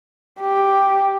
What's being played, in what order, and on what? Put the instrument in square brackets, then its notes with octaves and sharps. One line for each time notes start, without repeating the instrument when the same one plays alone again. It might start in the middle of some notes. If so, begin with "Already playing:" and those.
[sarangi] G4